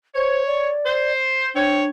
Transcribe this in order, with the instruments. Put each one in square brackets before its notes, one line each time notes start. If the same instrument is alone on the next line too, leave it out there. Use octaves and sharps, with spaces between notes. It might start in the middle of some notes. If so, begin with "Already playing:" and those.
[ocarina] C5 [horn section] C#5
[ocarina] D5
[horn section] C5
[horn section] C4 C#5 [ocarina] D4